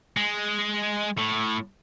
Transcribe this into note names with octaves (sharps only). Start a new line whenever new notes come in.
G#3
A2